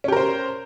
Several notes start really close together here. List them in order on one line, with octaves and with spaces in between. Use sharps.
C#4 G4 A#4 C5